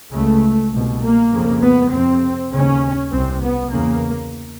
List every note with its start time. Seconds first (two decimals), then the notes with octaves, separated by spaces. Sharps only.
0.12 C#2 C#3 A3
0.73 C2 B2
1.02 A#3
1.32 F2 C#3
1.62 B3
1.93 F2 C3 C4
2.52 D#2 C#3 C#4
3.12 C2 C3 C4
3.42 B3
3.72 E2 C#3 A#3